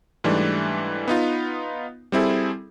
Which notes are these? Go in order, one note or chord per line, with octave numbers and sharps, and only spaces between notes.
G#2 E3 G3 A3 D4
B3 D#4 F4
G3 C4 E4 G#4 A4